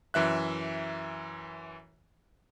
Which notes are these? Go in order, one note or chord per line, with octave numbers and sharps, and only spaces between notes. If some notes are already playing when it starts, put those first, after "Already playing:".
F#2 E3 E5 F#6